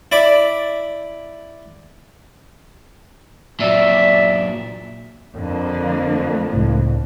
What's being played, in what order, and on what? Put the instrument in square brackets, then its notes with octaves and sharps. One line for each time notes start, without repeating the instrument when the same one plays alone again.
[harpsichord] E4 D5 B5 D6
[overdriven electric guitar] A#2 F#3 [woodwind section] D5 E5
[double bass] F2 [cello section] D3 F3 A#3
[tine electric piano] C#2 A2